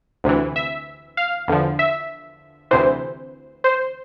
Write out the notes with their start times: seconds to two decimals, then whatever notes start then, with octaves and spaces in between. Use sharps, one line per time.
0.24 D2 C3 E3
0.56 E5
1.17 F5
1.48 E2 D3 F3
1.79 E5
2.71 D2 C3 E3 C5
3.64 C5